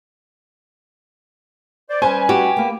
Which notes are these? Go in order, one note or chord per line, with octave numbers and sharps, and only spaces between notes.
C5 D5
G3 C#4 B4 C5 G#5
F#4 G4
A#3 B3